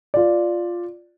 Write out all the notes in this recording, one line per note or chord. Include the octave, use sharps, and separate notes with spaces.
F4 D5